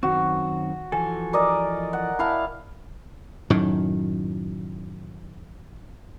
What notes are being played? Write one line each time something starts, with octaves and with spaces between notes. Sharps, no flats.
F#2 D#3 C4 F#4
E3 F3 A4 G#5
A#4 D5 D#5
F#5
E4 F5 A5
F#2 A2 D#3